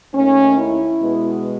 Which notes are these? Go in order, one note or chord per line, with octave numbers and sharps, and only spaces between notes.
D#2 D#3 A3 C#4
E4
B2 G#3 B3